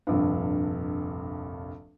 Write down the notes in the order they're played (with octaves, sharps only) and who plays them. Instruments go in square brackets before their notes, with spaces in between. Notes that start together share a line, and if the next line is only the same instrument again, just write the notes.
[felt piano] F1 A#1 G2